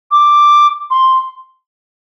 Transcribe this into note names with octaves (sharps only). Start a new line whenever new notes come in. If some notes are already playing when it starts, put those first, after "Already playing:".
D6
C6